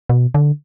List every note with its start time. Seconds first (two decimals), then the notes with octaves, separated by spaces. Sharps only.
0.10 B2
0.34 D3